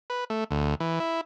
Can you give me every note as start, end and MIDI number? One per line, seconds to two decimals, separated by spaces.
0.10 0.24 71
0.30 0.44 57
0.51 0.75 38
0.80 0.99 52
1.00 1.21 64